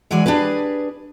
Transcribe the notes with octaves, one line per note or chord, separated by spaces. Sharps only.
E3 F#3 G#3 D5 G#5
D4 G4 G#4 B4